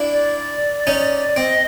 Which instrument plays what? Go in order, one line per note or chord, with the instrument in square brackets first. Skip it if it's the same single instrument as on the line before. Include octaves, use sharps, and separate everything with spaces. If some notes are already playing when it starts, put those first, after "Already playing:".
Already playing: [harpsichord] D4 E4
[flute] D5
[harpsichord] C#4 D#4
[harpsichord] C4 [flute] D#5